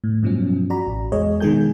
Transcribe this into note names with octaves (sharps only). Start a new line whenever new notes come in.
A2
G2 B2 F3 F#3 C#4
F#4 D5 A#5 B5
A1
E2 G#3 G#4 C#5 D#5
B2 D#3 G#3 G#4 G#5 G6